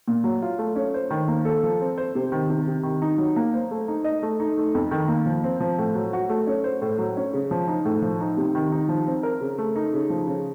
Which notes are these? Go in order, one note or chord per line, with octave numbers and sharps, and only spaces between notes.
A#2
F#3
F4
A3
C#4
C5
D#3
A#3
A4
F3
C4
C5
C3
D#3
C3
C3
D#3
D#4
F#3
A#3
C5
A3
D#4
D#5
A3
D#4
A3
F2
D#3
A#3
F3
C4
F3
A2
F#3
F#4
A3
C#4
C5
A2
F#3
C#4
C#3
F3
D#4
A2
F3
D#4
C3
D#3
D#4
F3
C4
A#4
C#3
A3
D#4
C#3
F3
C#3